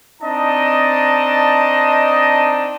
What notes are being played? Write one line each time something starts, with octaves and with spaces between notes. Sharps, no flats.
C4 D4 D#4 D#5 A5